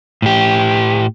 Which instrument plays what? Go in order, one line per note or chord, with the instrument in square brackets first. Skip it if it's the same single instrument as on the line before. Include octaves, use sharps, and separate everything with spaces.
[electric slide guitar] A2 G4